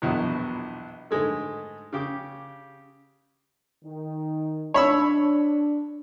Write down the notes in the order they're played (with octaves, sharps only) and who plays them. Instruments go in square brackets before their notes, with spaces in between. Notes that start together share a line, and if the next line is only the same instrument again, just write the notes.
[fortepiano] A#1 E2 G2 B2 E3 F#3
G#2 D3 G#3 A3
C#3 G4 D6
[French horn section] D#3
[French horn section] D4 [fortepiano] C#5 B5 E6